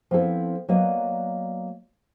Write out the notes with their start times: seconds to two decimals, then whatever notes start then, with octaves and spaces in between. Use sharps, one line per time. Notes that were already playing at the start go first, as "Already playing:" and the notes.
0.11 F3 B3 C4 E4 A4
0.69 F#3 A#3 B3 D5 D#5